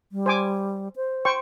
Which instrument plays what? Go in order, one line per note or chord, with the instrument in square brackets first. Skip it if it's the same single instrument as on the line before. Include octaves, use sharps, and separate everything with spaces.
[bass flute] G3
[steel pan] C5 G#5 D6
[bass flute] C5
[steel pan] C5 G5 C#6